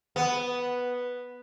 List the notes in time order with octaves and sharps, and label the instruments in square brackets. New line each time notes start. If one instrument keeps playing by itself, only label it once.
[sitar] B3